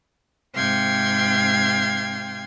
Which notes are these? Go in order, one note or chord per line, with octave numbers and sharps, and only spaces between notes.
G#2 C3 F5 G5 C6 G#6